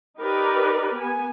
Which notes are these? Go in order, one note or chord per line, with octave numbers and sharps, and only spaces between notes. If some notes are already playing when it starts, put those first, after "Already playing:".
D#4 G4 A#4 B4 D5
B3 G#5